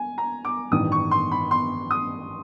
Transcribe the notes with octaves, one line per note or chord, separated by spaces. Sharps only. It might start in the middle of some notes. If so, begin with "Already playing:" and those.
Already playing: G#5
A#5
D6
A1 G2 D#3 D#6
C#6
C6
B5
C6
D#6